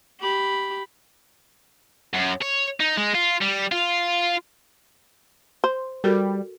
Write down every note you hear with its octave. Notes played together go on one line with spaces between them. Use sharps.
G4 B5
F#2
C#5
D#4
G#3
F4
G3
F4
C5
G3 F#4 A4 A#4